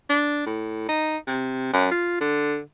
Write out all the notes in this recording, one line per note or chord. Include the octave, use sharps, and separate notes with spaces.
D4
A2
D#4
C3
F#2
F4
D3